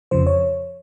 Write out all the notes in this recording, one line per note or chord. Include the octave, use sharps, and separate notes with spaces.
F2 C#3 F3 C5
C#5